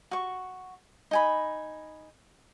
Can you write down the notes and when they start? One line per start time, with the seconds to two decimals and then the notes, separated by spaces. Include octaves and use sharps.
0.11 F#4 C#6
1.11 D#4 G#5 B5